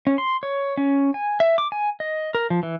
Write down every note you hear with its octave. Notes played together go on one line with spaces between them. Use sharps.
C#4
C6
C#5
C#4
G#5
E5
D6
G#5
D#5
A#4
F3
E3